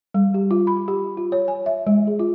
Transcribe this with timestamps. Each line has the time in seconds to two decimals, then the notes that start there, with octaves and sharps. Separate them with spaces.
0.14 G3
0.34 G4
0.51 F4
0.67 B5
0.88 G4
1.17 F4
1.32 C#5
1.48 G#5
1.66 E5
1.87 G#3
2.07 G#4
2.19 F4